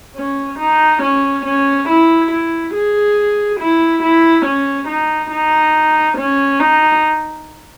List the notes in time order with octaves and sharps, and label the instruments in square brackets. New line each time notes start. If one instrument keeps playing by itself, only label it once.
[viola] C#4
D#4
C#4
C#4
E4
E4
G#4
E4
E4
C#4
D#4
D#4
C#4
D#4